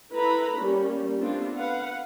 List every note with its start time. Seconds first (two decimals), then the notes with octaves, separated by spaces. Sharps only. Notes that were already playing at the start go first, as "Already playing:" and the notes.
0.13 E4 A4 B4 A#5 B5
0.57 G3 A#3 C#4
1.19 A3 B3 C4 D4 F4 A4
1.55 B4 F5 F#5